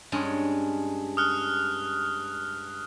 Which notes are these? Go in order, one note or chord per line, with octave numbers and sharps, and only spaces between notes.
G2 G#3 C#4
D#6 F6 F#6